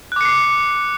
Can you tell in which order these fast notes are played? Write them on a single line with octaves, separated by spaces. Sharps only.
F#6 D6 C#7 C7